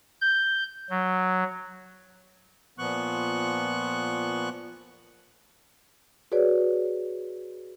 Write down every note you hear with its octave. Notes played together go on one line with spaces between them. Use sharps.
G6
F#3
A#2 F3 B3 C#6 F#6
F#4 G#4 B4 C#5 D5